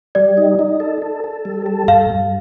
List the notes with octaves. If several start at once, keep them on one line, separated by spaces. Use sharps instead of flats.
G3 D5
D#4
D#4
A4
A4
A4
G3
A4
G2 F5
G2